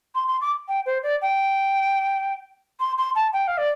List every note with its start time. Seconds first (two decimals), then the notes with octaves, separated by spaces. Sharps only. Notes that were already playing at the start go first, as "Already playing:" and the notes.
0.15 C6
0.28 C6
0.41 D6
0.68 G5
0.86 C5
1.03 D5
1.22 G5
2.80 C6
2.98 C6
3.15 A5
3.33 G5
3.48 F5
3.58 D5